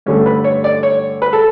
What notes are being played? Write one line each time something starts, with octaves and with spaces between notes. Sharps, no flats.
G2 D3 A3 C#4
B4
C#5
D5
C#5
B4
A4